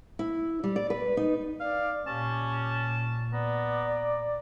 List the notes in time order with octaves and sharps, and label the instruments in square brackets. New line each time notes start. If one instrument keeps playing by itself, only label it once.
[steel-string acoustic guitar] E4
G3
D5
B4
D#4
[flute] D5 [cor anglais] F5
[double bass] A#2 [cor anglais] C#4 [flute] G4 [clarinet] A5
[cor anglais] B3 [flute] D5 [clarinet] A#5